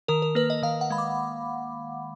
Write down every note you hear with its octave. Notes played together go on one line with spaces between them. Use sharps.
D#3 A#4
A#4
A#3 B4
D#5
D#3 F5
F#5
G#3 B5
D6